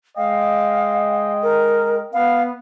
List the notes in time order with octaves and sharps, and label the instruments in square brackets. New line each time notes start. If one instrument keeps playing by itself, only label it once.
[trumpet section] G#3 D#5 G5 [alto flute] F5
[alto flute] A#4
[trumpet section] B3 [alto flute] F5